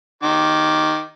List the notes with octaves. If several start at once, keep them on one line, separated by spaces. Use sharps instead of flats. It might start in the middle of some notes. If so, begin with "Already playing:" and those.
D#3 D6